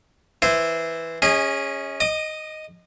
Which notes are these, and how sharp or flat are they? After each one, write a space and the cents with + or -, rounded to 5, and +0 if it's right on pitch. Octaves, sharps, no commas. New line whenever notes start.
E3 +0 E4 +0 C5 -15
C#4 +0 G#4 -20 D#5 +30
D#5 +0 D#6 -40